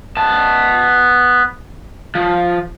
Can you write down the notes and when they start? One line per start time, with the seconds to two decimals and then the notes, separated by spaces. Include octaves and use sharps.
0.17 B3 A5
2.15 F3